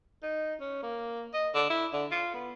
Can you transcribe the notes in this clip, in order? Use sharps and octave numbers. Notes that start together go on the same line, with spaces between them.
D#4
C#4
A#3
D#5
D3
E4
D3
F4
B3